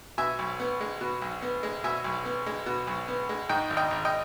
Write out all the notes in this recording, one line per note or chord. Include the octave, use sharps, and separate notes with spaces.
B2 E5 G#5
B1
B3
G#3
B2
B1
B3
G#3
B2 E5 G#5
B1
B3
G#3
B2
B1
B3
G#3
G#2 D#5 G5
G#1
D#5 G5
G#1
D#5 G5